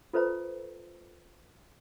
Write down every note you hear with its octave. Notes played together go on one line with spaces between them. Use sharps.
F4 A4 B4 C5 E5 A#5